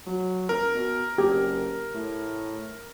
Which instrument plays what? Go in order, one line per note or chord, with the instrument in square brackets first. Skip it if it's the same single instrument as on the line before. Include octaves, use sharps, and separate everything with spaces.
[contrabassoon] F#3
[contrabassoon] D#1 [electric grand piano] A#4
[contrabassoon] B2
[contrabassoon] F#1 [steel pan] G4
[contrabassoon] A2